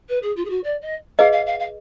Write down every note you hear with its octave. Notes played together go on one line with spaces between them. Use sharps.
B4
G#4
F4
G#4
F#4
D5
D#5
G#4 B4 D#5 F5
F5
F5
F5